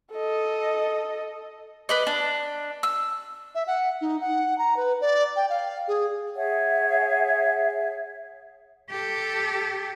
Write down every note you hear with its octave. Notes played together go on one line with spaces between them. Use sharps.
A4 D#5
B4 D5 D#5
D4
E6
E5
F#5
D#4
F#5
A#5
B4
D5
G5
F5
G#4
G#4 C#5 E5 F#5
G4 A4